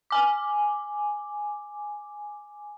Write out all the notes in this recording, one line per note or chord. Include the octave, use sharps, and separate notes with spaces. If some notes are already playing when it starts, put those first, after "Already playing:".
G#5 D6